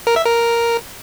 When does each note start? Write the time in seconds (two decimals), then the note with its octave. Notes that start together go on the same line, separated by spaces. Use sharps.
0.07 A#4
0.16 E5
0.26 A#4